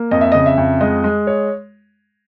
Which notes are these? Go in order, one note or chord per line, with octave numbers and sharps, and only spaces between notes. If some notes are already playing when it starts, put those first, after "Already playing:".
Already playing: A#3
F2 D#5
E5
C#3 D#5
E5
F2
G#3 D#5
G#3
C#5